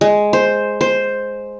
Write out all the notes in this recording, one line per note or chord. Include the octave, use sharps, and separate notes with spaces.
G#3
C5
C5